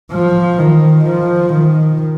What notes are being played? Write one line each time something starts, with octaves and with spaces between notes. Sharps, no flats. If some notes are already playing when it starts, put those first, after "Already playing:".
F3
D#3
F3
D#3